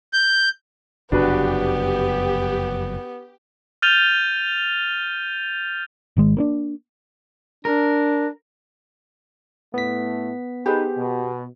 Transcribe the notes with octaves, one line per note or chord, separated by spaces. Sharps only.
G6
F#1 F2 C3 B3 D4 F#4 G4 B4
F6 G6 A6 D#7 F7 G7
G#1 D#3 G#3
A#3 C4 D4
D4 A#4
A2 A3 B3 B6
D#4 G4 G#4 B4 C5
B2